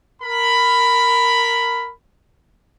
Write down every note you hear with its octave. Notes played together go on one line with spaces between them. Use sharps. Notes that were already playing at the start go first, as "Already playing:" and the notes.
A#4 B5